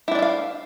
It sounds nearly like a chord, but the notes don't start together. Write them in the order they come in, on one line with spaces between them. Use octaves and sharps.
E4 D4 D5 E5 F5